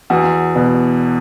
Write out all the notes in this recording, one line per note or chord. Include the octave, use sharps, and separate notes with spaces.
E2 F#4
B2